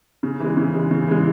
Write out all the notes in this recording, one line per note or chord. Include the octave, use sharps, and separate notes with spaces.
C#3
E3 G#3
C#3
E3 G#3
C#3
E3 G#3